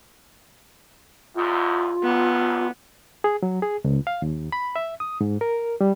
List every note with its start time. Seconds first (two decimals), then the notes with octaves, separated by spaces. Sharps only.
1.36 E2 G#2 F4
2.03 A1 F#2 G3 B3
3.24 G#4
3.43 F#3
3.62 G#4
3.84 C#2
4.07 F5
4.22 D#2
4.52 B5
4.76 E5
5.00 D#6
5.21 G#2
5.41 A#4
5.81 G3